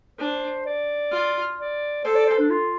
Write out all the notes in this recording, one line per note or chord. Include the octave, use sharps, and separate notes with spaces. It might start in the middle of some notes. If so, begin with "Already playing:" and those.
D4 C5
D5
F4
D5
A4 C5
D5
C5
D4
F4